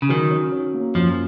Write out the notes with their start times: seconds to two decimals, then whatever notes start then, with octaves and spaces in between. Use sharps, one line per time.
0.02 C#3
0.09 D#3 F#3
0.31 C#4
0.52 C#4
0.74 A#3
0.95 F#2 F3